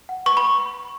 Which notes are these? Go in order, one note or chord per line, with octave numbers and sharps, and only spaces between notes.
F#5
B4 C#6
B5